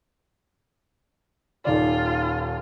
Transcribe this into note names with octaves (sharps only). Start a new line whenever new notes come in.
D#1 D#2 F4 D5